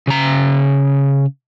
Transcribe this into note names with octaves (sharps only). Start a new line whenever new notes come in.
C#3 A#5